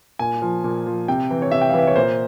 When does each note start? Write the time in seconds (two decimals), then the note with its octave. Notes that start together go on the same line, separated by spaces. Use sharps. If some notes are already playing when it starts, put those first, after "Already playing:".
0.19 A#2 G#5
0.42 F3
0.64 A#2
0.86 F3
1.08 C3 G5
1.30 E3
1.42 C#5
1.51 C3 E5
1.61 G5
1.69 F5
1.73 E3
1.79 E5
1.87 C#5
1.96 A#2 C5